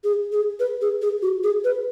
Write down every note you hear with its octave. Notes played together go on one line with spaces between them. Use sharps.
G#4
G#4
B4
G#4
G#4
F#4
G#4
B4